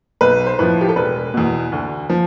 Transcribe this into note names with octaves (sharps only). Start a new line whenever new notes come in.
B1 B4
C5
A2 F3 B4
G4
A4
E1 B4
E2 B2
D2
F3